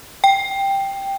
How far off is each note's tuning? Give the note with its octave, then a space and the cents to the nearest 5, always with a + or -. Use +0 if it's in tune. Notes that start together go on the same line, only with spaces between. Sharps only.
G5 +5